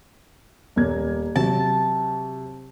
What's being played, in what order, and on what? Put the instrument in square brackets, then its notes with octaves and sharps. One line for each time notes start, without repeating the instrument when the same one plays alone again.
[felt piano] D#1 A#3 G#6
[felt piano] C3 F#3 [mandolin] A5